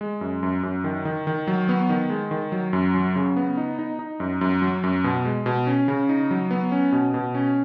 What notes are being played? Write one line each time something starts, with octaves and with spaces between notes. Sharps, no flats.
G#3
F#2
F#2
F#2
D#3
D#3
D#3
F#3
B3
D#3
G#3
D#3
F#3
F#2
F#3
C#3
B3
D#4
D#4
D#4
F#2
F#2
F#3
F#2
B2
G#3
B2
C#4
C#3
D#4
F#3
B3
C#4
B2
B2
C#4